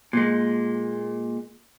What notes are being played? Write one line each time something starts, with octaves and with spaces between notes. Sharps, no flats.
A#2 G#3